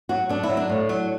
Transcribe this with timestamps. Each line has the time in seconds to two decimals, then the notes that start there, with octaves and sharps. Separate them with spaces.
0.09 F#3 F#4
0.29 F#3 D4
0.43 E4
0.49 F#3
0.57 D4
0.69 A2
0.89 F#3